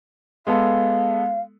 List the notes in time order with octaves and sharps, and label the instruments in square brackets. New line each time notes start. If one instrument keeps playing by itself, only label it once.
[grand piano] G#3 B3 A4 [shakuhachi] F5